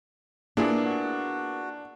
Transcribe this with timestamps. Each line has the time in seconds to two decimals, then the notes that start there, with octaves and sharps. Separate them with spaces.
0.57 A#2 A#3 B3 D4 E4 G#4
0.84 F#4